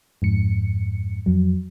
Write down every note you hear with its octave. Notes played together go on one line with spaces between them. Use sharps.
F2 G#2 C#7
F2 F#3